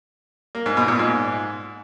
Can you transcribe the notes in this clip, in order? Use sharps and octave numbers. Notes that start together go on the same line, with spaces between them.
A#3
G#2
B2
A#2
G#2